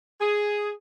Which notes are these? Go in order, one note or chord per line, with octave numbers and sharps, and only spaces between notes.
G#4